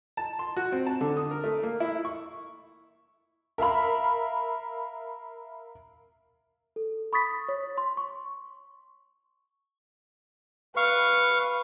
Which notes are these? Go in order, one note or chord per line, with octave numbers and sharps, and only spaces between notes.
A5
C6
F#4
C4
A5
D3
D#6
A#4
A3
A#3
E4
C#6
A#4 E5 F5 B5
A4
B5 C#6 D#6 A6 B6
C#5
C6
C#6
B4 F5 C#6